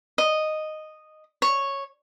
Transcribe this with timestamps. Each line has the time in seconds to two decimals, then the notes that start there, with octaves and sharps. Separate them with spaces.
0.18 D#5
1.42 C#5